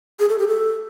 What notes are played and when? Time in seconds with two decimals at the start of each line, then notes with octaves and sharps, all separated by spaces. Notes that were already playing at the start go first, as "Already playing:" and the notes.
0.20 G#4
0.29 A4
0.38 G4
0.48 A4